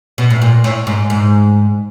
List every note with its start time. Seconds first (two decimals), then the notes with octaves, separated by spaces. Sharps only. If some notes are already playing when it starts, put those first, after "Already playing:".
0.18 B2
0.30 A2
0.42 A#2
0.64 A2
0.87 G#2
1.10 G#2